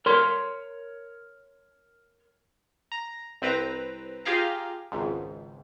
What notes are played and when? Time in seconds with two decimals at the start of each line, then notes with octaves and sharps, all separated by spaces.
0.06 A#4 C#5 C6
2.92 A#5
3.42 C2 C4 B4 A#5
4.25 F4 G4 G#4 F5 A#5
4.92 G#1 C#2 G#2